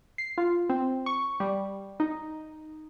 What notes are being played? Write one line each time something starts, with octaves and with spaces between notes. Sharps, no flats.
C7
F4
C4
C#6
G3
D#4